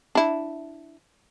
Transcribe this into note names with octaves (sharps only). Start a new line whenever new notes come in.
D4 E4